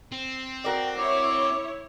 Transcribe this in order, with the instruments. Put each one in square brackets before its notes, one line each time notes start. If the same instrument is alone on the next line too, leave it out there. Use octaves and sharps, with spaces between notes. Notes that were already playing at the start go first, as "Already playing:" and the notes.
[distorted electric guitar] C4
[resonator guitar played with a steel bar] F#4 A#4 D5 [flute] G5
[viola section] E4 C#5 [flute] D6